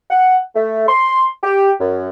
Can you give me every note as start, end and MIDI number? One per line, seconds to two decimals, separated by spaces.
0.11 0.37 78
0.55 0.85 57
0.87 1.24 84
1.43 1.71 67
1.79 2.10 42